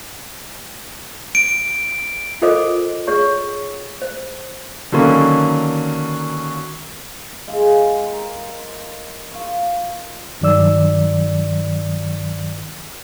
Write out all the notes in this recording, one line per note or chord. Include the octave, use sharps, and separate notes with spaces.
D7
F4 A4 A#4 C5 D#5 D6
G#4 C#5 C#6
C5
D3 D#3 F#3 A#3 C#4
G#3 F4
A#4
F4 C#6
G2 D#3 F#3 D5 E6